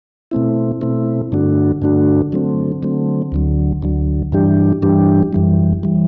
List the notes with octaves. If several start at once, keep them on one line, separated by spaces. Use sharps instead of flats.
B2 A3 C4 E4
B2 A3 C4 E4
G2 D3 A3 D4 F#4
G2 D3 A3 D4 F#4
D3 F#3 A3 C4
D3 F#3 A3 C4
D2 D3 F#3
D2 D3 F#3
G2 E3 G3 D4 G4
G2 E3 G3 D4 G4
F#2 E3 G3
E3 G3